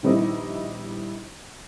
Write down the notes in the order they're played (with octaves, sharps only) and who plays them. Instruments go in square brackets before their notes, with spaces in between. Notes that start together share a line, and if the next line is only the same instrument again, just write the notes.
[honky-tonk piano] A#1 D#3 G3 B3 D#4 E4